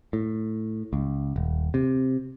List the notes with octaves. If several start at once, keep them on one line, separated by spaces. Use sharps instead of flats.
A2
C#2
D#1
C3